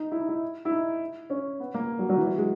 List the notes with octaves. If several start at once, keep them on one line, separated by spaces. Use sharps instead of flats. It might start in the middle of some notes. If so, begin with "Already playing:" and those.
Already playing: D#4
E4
D#4
E4
E4
D#4
C#4
B3
A#3
F#3
F#3
E3
F#3
G#3